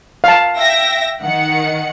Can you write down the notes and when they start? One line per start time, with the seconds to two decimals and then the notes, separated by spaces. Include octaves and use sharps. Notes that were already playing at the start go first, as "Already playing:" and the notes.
0.24 F5 A5
0.56 E5 G5 A#6
1.22 D#3 F#5 C#7